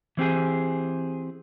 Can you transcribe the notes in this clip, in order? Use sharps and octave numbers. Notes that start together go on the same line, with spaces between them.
E3 C4 G4 G#4